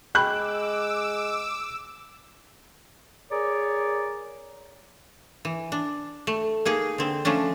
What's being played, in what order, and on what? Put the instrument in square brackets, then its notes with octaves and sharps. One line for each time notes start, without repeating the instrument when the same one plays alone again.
[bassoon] G#3 [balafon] G5 B5 C#6 [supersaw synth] D6 E6 [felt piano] F#6
[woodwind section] G#4 A#4 C#5 D5 A#5 D6
[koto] E3
D4
A3
A#3 D#4 G#4
D3 C4
F3 A3 C#4 D4